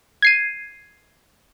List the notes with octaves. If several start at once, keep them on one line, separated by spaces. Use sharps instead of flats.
G#6 C7 D#7